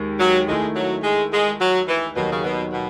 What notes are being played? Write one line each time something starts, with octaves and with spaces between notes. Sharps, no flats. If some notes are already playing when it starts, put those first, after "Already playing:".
Already playing: D#2 G#3
F#3
D#3 G#3 A3 E4
F#3
G#3
G#3
F#3
E3
D#2 B2 D#3 F#3
C#3
B2
B2